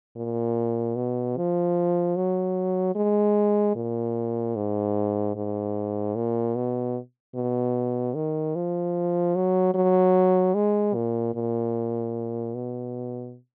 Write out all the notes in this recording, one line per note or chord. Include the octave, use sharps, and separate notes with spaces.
A#2
B2
F3
F#3
G#3
A#2
G#2
G#2
A#2
B2
B2
D#3
F3
F#3
F#3
G#3
A#2
A#2
B2